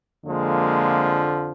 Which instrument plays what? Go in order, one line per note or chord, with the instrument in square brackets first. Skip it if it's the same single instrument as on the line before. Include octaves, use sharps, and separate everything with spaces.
[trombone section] F2 D3 F3 G#3 A#3